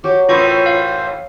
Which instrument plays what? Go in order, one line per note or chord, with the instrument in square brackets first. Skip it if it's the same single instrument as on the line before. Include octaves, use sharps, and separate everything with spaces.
[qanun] F#3 [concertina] G4
[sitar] F#2 A2 E3 [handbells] F4 C#6 [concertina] C5
[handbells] F5